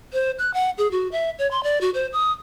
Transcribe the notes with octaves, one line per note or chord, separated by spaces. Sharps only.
C5
F#6
F#5
G#4
F#4
E5
C#5
C6
D5
F#4
C5
D#6